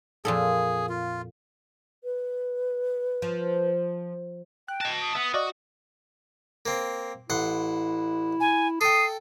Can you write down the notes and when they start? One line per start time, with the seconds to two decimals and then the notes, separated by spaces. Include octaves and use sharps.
0.25 F2 A#2 G#4 A4
0.89 F4
2.04 B4
3.22 F3
4.68 G5 F#6
4.81 D#5 A5 F#6 A#6 D7
5.01 D#6
5.15 B3 E5
5.34 F#4 D5 D#5 F5
6.66 A#3 C4
7.30 A1 E4 F#5 C6
8.40 G#5
8.81 A4 G5 D#6 C7